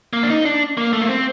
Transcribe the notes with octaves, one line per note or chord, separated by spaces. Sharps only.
A#3
D4
D#4
D4
A#3
A3
A#3
C4